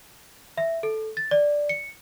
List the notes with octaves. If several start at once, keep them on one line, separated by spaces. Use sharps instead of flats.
E5
A4
A6
D5
C#7